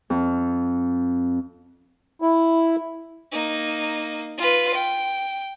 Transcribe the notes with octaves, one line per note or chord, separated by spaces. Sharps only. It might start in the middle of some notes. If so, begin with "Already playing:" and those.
F2
E4
A#3 D#4
F4 B4
G5